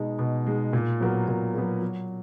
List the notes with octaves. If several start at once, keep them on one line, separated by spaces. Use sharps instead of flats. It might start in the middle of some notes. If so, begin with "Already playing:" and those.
Already playing: B2 G#3 D#4
B2
G#3 D#4
A#2
F#3 B3 F#4 A#4
A#2
F#3 B3 F#4 A#4
F#3